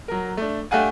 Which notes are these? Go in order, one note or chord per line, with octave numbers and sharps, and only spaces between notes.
F#3 A#4
A3 D4
A3 D4 G4 F5 F#5 G#5